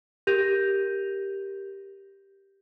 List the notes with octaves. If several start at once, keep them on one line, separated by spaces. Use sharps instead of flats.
G4 A#4 G6 A#6 D#7 F7